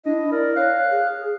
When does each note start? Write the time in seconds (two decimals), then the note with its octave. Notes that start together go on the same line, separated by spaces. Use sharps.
0.06 D4 E4 D#5
0.32 A#4 D5
0.56 C#5 F5 F#6
0.90 G#4